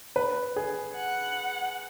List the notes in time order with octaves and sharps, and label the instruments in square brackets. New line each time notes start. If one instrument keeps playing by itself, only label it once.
[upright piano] B4
G#4
[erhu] F#5